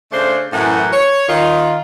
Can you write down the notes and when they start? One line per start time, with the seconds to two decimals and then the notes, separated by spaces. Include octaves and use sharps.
0.12 C#3 A3 D4 C5
0.53 F#2 A2 E3 F#4 A#4 F#5
0.92 C#5
1.28 D#3 F4